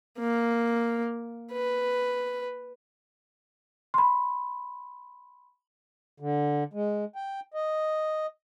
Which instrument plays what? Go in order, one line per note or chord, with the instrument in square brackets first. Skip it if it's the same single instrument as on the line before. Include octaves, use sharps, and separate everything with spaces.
[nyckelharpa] A#3
B4
[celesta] B5 C6
[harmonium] D3
G#3
G5
D#5